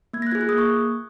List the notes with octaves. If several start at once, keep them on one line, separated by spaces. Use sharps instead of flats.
A#3 G#6
A#6
F#6
F4 G#4 G#6
F#6
A#3 D#6
C#6